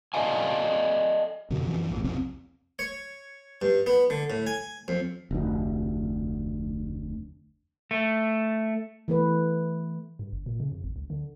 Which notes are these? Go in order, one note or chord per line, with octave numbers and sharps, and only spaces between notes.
A4 D5 D#5 F5 G#5
F2 B2 D3
F#2 E3 F3
A#1 F2 A2
B1 F2 C3 C4
C#5
G2
B3
D3
A2
G#5
F2
F1 D2
A3
E3 A3 B4
G2
G1
A#2
C#3
F2
G#1
C#2
D3